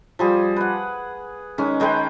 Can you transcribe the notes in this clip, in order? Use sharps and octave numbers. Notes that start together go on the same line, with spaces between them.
F3 G3 G#4
B4 F#5
D#3 G#3 C#4
D#3 G#3 B4 G5